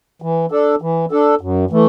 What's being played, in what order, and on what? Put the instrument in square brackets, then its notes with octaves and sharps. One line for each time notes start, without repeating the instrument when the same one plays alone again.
[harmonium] E3
D4 A4
E3
D4 A4
F#2
E3 A3